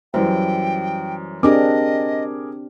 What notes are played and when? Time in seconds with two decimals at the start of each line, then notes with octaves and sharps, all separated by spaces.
0.14 F#2 E3 G3 C5 G5
1.43 C4 D4 G4 G#4 A#4 D#5 D6